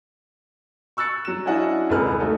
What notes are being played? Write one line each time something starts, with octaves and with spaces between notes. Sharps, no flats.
C#6 E6 F#6 A6 C#7
F#3 E7
C#4 D4 E4 F#4 D#5 F#5
D#1 C2 G#3 B4 F6
A3 C#4 D#4 F#4